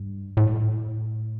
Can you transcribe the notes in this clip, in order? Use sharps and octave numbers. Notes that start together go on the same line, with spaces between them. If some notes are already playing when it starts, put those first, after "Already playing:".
Already playing: G2
A2